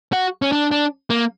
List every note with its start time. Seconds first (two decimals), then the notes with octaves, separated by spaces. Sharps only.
0.13 F#4
0.42 C#4
0.52 D4
0.71 D4
1.10 A#3